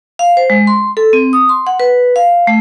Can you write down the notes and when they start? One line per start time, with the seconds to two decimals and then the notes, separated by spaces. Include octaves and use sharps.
0.19 F5
0.37 C5
0.50 G#3
0.67 C6
0.97 A4
1.13 C4
1.33 D#6
1.49 C6
1.67 F#5
1.80 B4
2.16 F5
2.47 A3